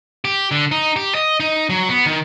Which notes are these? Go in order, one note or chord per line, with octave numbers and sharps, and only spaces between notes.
G4
D3
D#4
G4
D#5
D#4
F#3
B3
D#3